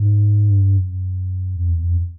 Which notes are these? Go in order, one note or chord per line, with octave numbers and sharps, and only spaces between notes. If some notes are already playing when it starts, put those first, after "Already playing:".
Already playing: G#2
G2
F#2
F2
E2
F2